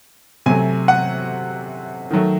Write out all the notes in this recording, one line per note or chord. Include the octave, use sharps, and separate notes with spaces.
C3 F#3 A3 G#5
F#5
D#3 F#3 A3